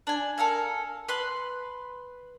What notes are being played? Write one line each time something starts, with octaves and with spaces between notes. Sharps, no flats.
D4 G#5
A4 A#4 F5 G#5
B4 B5 C6 F#6